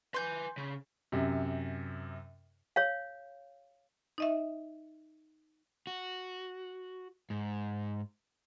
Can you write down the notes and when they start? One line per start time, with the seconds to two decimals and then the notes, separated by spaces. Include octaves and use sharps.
0.14 B4 G#5 C6 G6
0.57 C#3
1.12 F#2 C3
2.76 C#5 F5
4.18 D#4 D#5 E5
5.87 F#4
7.30 G#2